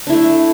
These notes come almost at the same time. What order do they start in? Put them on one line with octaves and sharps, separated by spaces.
D4 E4 A3